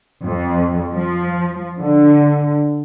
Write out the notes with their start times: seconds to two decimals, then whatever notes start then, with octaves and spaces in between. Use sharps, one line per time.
0.25 F2
0.92 F3
1.78 D3